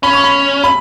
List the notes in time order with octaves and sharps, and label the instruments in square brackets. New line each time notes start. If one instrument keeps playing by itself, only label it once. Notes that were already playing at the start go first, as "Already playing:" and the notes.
[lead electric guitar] C#4 [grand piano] B5
[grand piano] C#6
B5
B5